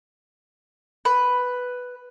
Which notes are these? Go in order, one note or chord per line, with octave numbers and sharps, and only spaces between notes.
B4